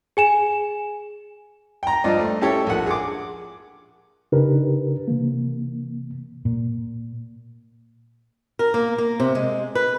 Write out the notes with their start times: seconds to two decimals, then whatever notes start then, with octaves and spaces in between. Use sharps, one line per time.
0.17 G#4 G#5 E7
1.83 G5 A#5
2.04 G2 F3 D5 D#5
2.19 A3
2.41 C#4 E4 G4 A4 C#5
2.67 A#1 F#5
2.86 G#4 D6
4.32 C#3 D4 D#4 G4 A#4 B4
5.08 C3 E3 A#3
6.45 A#2
8.59 A#4
8.74 A#3
8.98 A#3
9.20 C3
9.35 G#3
9.75 B4